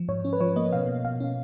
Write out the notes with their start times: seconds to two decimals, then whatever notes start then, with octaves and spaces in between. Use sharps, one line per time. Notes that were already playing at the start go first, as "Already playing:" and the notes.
Already playing: F3
0.08 G#2 C#5
0.25 C#4
0.33 B4
0.40 F3 C#5
0.56 A#3 D#5
0.73 B2 F5
0.88 B2
1.04 B2 F5
1.20 C#4